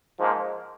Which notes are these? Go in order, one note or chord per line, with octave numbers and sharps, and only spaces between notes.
G#2 F3 A#3